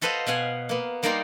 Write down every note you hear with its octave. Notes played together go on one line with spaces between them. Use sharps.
F#4 A4 B4 C5 D#5 F5
B2 F5 F#5 G#5
A#3 B3
G3 A#3 D#4 D5 A#5 C6